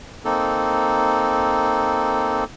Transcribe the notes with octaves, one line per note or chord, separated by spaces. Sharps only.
A#3 C4 D#4 A4